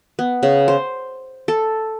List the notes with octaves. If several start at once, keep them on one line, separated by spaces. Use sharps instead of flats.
B3
C#3
C5
A4